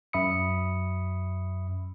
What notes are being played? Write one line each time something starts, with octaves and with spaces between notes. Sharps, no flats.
F#2 E5 B5 D#6 C#7